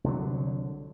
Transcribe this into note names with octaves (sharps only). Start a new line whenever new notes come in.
C2 D3 F#3